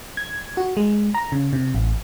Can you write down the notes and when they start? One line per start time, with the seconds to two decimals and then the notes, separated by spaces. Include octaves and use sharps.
0.17 G#6
0.57 F#4
0.77 G#3
1.14 A#5
1.32 C#3
1.53 C3
1.75 A1